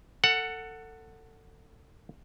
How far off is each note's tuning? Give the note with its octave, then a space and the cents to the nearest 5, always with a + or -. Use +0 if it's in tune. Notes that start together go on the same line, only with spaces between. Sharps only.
A4 +25 F#5 +0